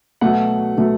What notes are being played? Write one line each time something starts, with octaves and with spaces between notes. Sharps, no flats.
B2 F#3 A3 F#5
B2 F#3 A3